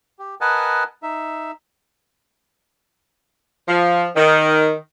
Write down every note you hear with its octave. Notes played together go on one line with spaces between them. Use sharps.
G4
A#4 B4 D#5 F#5 G#5 A5
D#4 E5
F3
D#3